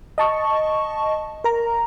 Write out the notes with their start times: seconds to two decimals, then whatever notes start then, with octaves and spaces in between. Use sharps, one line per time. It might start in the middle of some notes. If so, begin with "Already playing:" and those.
0.18 D#5 A5 C#6
1.44 A#4 A#5